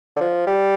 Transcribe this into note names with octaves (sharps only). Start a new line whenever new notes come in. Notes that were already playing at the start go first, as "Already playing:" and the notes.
D3
F3
G3